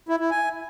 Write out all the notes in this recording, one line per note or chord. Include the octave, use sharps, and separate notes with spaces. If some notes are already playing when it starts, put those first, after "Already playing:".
E4
E4
G#5